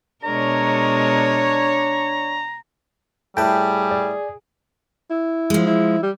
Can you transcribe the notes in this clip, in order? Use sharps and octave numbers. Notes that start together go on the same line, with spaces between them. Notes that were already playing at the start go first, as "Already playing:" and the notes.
B2 G#3 D4 A#4 C#5 A#5
A2 G3 G#4 B4 G5 A5
D5
E4
F3 G#3
E4
G3